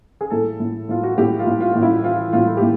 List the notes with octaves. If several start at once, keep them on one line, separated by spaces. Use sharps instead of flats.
G#4
A2 A4
A2
A2 F4
F#4
A2 G4
F4
A2
F4
A2
E4
E3 F4
A2 F4
G4
A2